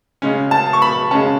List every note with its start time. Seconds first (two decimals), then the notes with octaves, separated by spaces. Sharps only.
0.22 C#3 G#3 C#4
0.51 A5
0.73 C#6
0.82 B5
1.11 C#3 G#3 C#4 A5